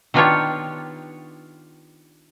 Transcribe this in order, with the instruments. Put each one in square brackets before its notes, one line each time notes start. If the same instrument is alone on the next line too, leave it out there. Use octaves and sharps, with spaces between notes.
[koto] D#3 B3 D4 F4 G4 C#5